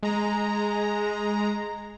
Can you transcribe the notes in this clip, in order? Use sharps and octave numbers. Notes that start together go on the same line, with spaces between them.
G#3 A#5